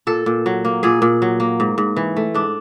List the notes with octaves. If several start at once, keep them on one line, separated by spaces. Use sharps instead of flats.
A#2 A4
A#2
F#3
A#3
A#2 G#4
A#2
F#3
A#3
G#2
G#2
E3
A3
G#2 D4